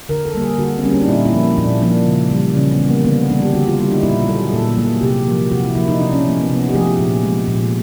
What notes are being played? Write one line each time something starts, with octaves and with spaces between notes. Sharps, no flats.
D3 A#4
A4
G3 A#3
G#4
D3 F#4
C4
G3 A#3 C#4
D4
D#4
A#2 E4
E4
F3 A#3
A#2 D4
F3 A#3 D4
C#3
E3 G3
C#3 C#4
B3
E3 G3
A#3
D3 B3
G3 A#3 D4
G4
D3 F#4
F4
G3 A#3 E4
D#4
A#2 E4
F4
F#3 A#3 A4
G#4
A#2 A4
G#4
F#3 A#3
G#4
C3 G4
F3 A#3
C3 F#4
E4
F3 A#3 E4
D#4
C3 D4
C#4
F3 A3 B3
B3
C3 B3
D#4
G4
F3 A3 G#4
G4
A#2
F3 G#3
A#2